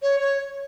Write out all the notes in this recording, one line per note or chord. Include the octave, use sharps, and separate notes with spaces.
C#5
C#5